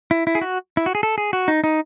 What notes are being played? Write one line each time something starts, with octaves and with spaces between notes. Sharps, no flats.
E4
E4
G#4
F#4
E4
F#4
G#4
A4
G#4
F#4
D#4
D#4